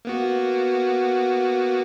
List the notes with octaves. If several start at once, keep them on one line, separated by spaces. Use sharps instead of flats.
A#3 B3 F#4